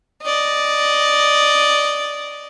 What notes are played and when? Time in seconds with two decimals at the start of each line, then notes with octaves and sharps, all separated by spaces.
0.22 D5 D#5